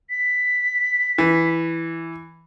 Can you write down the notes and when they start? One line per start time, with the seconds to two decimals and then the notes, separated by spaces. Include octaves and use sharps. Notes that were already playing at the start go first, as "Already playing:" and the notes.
0.10 B6
1.18 E3